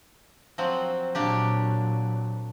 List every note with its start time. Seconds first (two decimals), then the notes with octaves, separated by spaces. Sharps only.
0.58 F3 F#3 C4
1.15 A#2 F#3 A#3 D4 G4